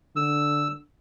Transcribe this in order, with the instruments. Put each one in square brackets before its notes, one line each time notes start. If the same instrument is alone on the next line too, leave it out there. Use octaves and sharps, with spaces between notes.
[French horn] D3 [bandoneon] E6